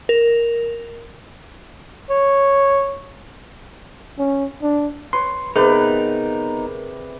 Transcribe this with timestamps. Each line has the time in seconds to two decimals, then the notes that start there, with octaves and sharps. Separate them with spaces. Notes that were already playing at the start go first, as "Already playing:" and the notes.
0.09 A#4
2.10 C#5
4.19 C#4
4.62 D4
5.13 B4 C#5 C6
5.56 C3 B3 D#4 G#4 A#4 B4 D5